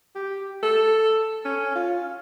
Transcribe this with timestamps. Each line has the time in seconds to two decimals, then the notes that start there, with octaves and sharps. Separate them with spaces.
0.15 G4
0.63 A4
1.45 C#4
1.75 F4